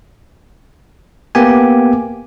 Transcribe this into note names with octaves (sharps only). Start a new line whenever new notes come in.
A#3 B3 G4 G#5